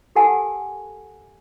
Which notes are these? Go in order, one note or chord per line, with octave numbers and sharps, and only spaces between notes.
G4 A4 A#4 F#5 G#5 A5